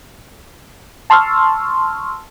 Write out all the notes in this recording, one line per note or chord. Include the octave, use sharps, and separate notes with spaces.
A5 C6 C#6 E6 F6